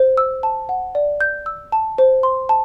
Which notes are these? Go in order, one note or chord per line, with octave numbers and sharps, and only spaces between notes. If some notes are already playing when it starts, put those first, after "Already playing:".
Already playing: C5
E6
A5
F#5
D5
G6
E6
A5
C5
C6
A5